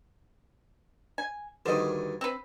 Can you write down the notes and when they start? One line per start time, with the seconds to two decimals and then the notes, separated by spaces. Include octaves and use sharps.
1.18 G#5
1.66 D2 G2 D#3 C5 D#5
2.21 C4 B4